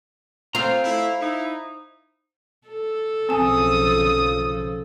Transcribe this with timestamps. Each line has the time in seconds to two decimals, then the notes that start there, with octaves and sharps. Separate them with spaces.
0.55 C4 F4 C5 F5 A#5
0.84 A3 E4
1.20 D#4 E4
2.68 A4
3.29 B1 C#3 F3 C4 G#5 D#6